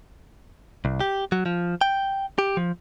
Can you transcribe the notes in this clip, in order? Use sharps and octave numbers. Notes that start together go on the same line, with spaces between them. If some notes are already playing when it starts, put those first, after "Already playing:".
C2
G4
F#3
F3
G5
G4
F3